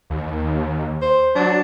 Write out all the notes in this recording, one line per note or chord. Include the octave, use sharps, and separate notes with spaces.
D#2
C5
F#3 D4